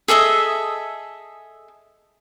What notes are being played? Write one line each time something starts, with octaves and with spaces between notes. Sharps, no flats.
G#4 A4 D#5 E5